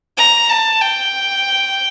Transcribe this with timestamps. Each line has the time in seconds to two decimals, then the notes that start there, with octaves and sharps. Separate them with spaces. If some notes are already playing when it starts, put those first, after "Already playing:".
0.18 A#5
0.49 A5
0.81 G5